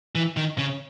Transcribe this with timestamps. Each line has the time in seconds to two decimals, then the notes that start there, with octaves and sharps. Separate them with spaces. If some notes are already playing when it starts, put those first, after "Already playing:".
0.15 E3
0.37 D#3
0.58 C#3